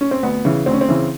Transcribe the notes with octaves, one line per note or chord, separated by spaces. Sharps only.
C#4
C4
D2 B3
C#3 E3
D2 C4
C#4
C4
C#3 E3